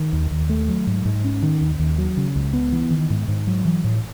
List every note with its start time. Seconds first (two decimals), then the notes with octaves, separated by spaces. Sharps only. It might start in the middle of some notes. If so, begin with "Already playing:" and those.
Already playing: D#3
0.13 D#2
0.31 D#2
0.49 A3
0.69 F#3
0.87 G#2
1.05 G#2
1.25 C#4
1.42 D#3
1.61 D#2
1.80 D#2
1.98 F#3
2.17 C#3
2.36 C#2
2.53 B3
2.72 E3
2.90 D#3
3.10 G#2
3.28 G#2
3.47 F#3
3.65 E3
3.84 A2